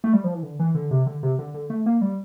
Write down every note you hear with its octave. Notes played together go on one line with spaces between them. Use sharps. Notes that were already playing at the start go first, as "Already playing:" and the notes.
A3
G3
F3
E3
D3
E3
D3
C3
D3
C3
D3
D3
A3
A#3
G3